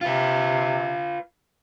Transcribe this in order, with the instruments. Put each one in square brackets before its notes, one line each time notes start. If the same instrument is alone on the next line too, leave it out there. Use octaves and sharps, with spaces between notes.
[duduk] C3 [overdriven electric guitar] F4 B4